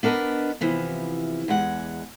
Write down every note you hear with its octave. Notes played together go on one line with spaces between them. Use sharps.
B3 D4 A#4 B4 D#5
C3 E3 F3 B3
E2 G#3 F#5